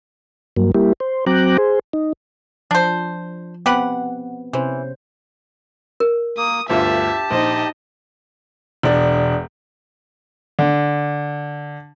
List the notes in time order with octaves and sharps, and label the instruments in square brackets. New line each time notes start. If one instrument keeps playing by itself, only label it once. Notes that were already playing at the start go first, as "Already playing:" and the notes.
[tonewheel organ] G2 F#3 A#3
G3 A#3 E4 G4
C5
F#3 C4 G5 A#5 D6 F#6
G#4 C5
D#4
[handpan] F3 [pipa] D4 C5
[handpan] B3 C4 [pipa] G4 B4 F#5
[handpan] C3 C#4 C5 [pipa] E3
[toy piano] A#4
[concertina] A#3 [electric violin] D#6
[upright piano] G1 D2 F4 [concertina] G4 A5 [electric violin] E5
[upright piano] A#1 C5 [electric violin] D#4 D#5
[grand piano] E1 D4
[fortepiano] D3